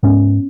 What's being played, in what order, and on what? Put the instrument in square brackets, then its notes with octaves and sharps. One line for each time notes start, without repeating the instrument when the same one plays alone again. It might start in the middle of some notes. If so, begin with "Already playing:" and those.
[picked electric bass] G#2 B3 C#4